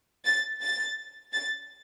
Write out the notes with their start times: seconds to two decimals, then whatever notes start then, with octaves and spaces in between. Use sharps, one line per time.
0.25 A6
0.62 A6
1.33 A6